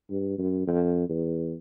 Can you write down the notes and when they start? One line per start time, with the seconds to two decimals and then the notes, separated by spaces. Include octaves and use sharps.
0.10 G2
0.38 F#2
0.67 F2
1.09 E2